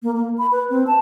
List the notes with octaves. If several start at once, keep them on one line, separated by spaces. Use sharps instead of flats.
A#3
A#3
B5
B4
C4
A5